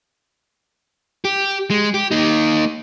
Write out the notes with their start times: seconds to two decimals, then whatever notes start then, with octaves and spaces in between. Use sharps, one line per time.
1.25 G4
1.70 G#3
1.94 G4
2.11 A#3 D#4